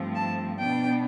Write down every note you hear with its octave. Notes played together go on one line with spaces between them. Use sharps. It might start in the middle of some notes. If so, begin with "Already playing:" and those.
Already playing: G2 F3 A3 C4
A5
B2 B3 D4 G5